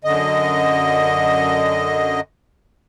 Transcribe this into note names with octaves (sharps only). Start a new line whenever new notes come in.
F#2 D3 D#5